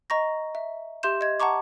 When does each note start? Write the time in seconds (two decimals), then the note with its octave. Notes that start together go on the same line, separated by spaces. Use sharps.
0.10 D#5 A#5 C#6 A#6
0.55 E5
1.03 G4 E5 C6 G6 E7
1.21 D#5 G#6
1.40 F#5 A5 A#5 C#6 D6